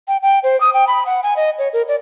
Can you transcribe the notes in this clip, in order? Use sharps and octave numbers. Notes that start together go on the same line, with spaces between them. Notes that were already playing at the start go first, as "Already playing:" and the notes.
G5
G5
C5
D#6
G5
B5
F#5
G#5
D#5
C#5
A#4
D5